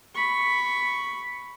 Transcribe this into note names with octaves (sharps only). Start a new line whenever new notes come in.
B5 C#6